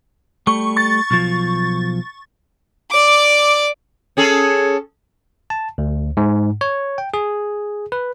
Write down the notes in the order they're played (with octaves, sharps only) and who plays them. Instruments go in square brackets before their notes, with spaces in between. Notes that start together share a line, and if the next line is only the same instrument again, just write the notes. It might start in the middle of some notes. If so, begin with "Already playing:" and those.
[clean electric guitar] G3 A3 [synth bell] C#6
[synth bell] C#6 A6
[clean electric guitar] B1 F3
[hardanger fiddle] D5 D6
[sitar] C#4 G#4 A4
[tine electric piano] A5
D2
G#2
C#5
G5
G#4
B4